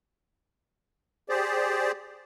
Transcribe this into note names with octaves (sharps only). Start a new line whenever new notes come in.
G4 G#4 C5 D5